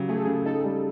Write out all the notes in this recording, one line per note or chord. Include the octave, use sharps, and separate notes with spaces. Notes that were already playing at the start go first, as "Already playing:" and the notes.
Already playing: C#3 F#3 G4
A3 G#4
A4
C#3 G#4
D#4 A4
G3